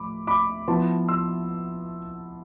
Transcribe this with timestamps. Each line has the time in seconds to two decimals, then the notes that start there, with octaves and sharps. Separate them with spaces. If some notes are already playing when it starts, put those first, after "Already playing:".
Already playing: A2 F3 A3 B5 D6
0.27 B5 D6
0.68 F3 B3 E4 A5 C6
1.08 C6 E6